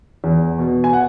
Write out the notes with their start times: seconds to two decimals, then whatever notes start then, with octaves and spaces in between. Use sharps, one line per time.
0.24 E2
0.58 B2
0.84 G#5
0.93 F#5